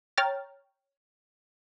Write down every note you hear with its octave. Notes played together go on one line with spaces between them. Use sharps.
C#5 G5 A#5 F6 A6